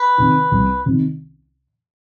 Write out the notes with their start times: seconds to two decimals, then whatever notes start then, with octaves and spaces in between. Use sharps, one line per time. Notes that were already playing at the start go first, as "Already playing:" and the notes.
Already playing: B4
0.18 C3 D#3
0.51 C2
0.86 C3 D#3